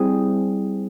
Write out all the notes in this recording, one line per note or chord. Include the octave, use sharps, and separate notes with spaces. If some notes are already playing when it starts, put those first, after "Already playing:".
Already playing: G3 C4 E4 G#4